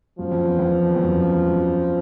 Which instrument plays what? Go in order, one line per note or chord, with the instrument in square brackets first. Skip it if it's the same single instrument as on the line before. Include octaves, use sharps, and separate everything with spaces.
[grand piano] F#2 [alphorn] F3
[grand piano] F2
E2
F2
E2
F2
F#2
F2
F#2